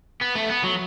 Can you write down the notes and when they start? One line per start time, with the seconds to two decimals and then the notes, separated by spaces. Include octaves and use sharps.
0.21 B3
0.35 A3
0.49 B3
0.64 F#3